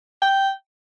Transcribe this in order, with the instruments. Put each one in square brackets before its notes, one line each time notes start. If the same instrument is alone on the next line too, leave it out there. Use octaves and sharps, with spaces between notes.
[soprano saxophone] G5